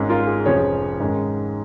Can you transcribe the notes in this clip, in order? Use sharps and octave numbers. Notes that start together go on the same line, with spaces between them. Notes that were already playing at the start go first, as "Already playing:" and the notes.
Already playing: G#1 G#2 G#3 C#4
F4 A#4
G#4
F1 F2 F3 C#4 G#4 C#5
G#2 D#3 G#3 C#4